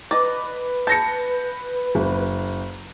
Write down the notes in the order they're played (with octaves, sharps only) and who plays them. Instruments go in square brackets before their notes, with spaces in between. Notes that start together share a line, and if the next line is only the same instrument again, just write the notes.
[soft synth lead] B4 [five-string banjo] D5 D#5
[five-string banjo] A5 [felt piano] G6 A#6 C#7
[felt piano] F#1